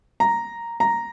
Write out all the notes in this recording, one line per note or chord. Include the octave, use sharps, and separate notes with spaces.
A#5
A#5